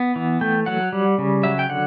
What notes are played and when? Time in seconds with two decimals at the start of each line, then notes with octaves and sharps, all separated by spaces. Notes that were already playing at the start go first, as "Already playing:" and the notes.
Already playing: B3
0.16 E3
0.41 A3 G5
0.66 F#3 F#5
0.93 G3
1.18 C#3
1.43 F#3 E5
1.59 G5
1.69 D3 F#5